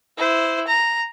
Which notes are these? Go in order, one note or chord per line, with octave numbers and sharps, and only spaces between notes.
E4 C5
A#5